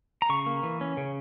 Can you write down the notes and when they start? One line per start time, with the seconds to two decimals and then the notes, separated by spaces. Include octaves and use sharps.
0.22 A#5
0.29 C#3 C#6
0.46 A#3
0.63 E3
0.81 C#4
0.97 C#3